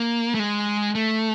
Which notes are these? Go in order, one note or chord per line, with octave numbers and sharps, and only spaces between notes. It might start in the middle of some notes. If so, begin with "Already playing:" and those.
Already playing: A#3
A3
G#3
A3